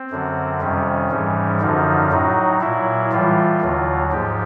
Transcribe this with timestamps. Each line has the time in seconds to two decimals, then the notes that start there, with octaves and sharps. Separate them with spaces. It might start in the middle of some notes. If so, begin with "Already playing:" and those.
Already playing: C4
0.10 F#2 D3 F#3
0.60 F2 C3 D#3 G3 C#4
1.11 G#2 E3 G3
1.61 F#2 D3 F3 D#4
2.11 A2 F#3 D#4
2.61 A#2 F#3 E4
3.12 A2 E3 G3 F4
3.62 D#2 D3 F#3
4.12 G#2 F3 G4